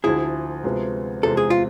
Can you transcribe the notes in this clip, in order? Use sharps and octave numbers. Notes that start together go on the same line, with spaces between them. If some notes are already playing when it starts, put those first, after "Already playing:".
D2 D3 F3 E4 G#4
D2 C3 F3 G#3 B3
E2 C3 F3 G#3 C4 A4
G#4
F4